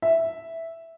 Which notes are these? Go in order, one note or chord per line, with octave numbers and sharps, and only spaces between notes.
E5